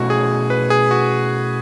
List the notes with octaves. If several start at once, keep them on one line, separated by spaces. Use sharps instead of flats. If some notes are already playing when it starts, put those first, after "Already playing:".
Already playing: B2 A3 C#4 E4 F#4
G#4
B4
G#4
F#4